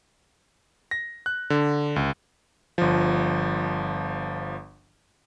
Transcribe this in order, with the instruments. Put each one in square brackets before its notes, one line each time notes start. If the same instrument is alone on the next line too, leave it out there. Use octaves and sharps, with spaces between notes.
[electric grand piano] A#6
F#6
D3
C#2
G1 F3